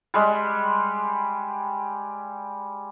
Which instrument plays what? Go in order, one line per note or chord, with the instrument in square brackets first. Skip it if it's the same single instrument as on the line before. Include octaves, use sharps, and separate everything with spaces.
[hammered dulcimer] G3 G#3